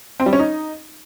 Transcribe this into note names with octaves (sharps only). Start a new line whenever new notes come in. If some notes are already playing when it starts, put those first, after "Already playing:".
C4
G3
C#4
D#4